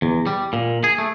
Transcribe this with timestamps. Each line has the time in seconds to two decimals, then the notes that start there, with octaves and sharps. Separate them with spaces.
0.02 E2
0.27 G3
0.53 A#2
0.84 G#4
0.98 A3